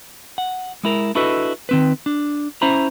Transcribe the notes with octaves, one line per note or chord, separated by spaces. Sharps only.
F#5
G#3 E4 A#4
D4 E4 F#4 A4 B4 D#5
D#3 C4 B4
D4
C#4 E4 C5 E5 A#5 B5